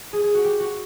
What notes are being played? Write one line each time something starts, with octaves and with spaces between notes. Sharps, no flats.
G#4
G#4
F#4
G4
F#4